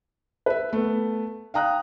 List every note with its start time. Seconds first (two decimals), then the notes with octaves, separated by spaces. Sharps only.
0.46 B4 E5
0.73 A3 B3
1.54 F5 G5 A#5 D#6 F#6